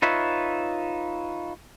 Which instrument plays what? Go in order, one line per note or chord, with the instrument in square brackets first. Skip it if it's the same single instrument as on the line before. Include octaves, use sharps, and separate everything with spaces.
[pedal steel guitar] D#4 F4 B4 C#5 E5